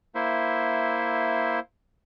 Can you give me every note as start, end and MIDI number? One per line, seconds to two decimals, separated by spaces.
0.15 1.59 58
0.15 1.59 64
0.15 1.59 72
0.15 1.59 76